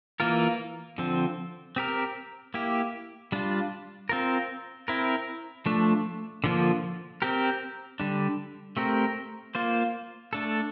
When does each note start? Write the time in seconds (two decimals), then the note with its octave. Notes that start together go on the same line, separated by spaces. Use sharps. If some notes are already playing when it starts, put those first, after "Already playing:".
0.20 E3 A#3 F4 A#4
0.98 D3 F3 C4
1.76 C4 G4 A#4
2.54 A#3 E4 G4
3.32 G3 D4 F4
4.09 C4 F4 A#4
4.88 C4 E4 A#4
5.66 F3 A3 D4
6.44 D3 F3 A#3
7.22 C4 G4 A#4
8.00 D3 G3 D4
8.77 A3 C4 G4 A#4
9.55 A#3 F4 C5
10.33 A3 D4 A4